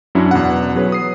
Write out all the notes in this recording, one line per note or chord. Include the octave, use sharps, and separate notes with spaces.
F#2 F#3 C#4 D4 E4
E2 B2 F#5
F#3 G#4 B4 C#5
D#6 C7